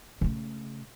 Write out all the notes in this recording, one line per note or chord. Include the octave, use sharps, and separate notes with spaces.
C#3 A3